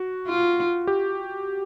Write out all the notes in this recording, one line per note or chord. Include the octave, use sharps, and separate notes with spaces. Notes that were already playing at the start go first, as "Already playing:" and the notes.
Already playing: F#4
F4
G4